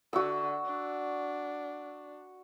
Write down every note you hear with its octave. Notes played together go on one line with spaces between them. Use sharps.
D3 F#4 E6
D4